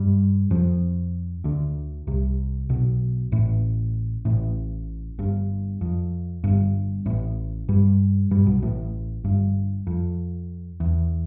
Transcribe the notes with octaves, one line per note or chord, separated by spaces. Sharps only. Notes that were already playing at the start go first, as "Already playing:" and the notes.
Already playing: G2 G3
F2 F3
D2 D3
C2 C3
B1 B2
A1 A2
A1 A2
G1 G2
F2
G1 G2
A1 A2
G2 G3
G2 G3
B1 B2
A1 A2
G1 G2
F2
E2